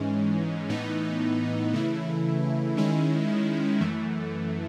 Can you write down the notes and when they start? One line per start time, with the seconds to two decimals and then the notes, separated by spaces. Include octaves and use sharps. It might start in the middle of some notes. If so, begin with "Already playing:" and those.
Already playing: G#2 E3 G#3 C#4
0.69 A2 E3 B3 D#4
1.73 C#3 E3 A3 E4
2.77 D#3 G#3 C#4 E4
3.80 F#2 E3 A3